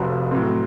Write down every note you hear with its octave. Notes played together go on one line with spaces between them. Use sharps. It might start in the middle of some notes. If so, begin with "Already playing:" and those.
Already playing: F1 F2 C3 F3 F#4
A2 F#3 C4